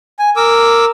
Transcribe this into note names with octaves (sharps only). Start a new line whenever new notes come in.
G#5
A#4 D6 E6